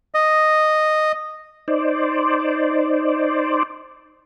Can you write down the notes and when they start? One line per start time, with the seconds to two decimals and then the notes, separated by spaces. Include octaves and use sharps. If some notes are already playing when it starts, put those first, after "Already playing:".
0.15 D#5
1.68 D#4 C5 D5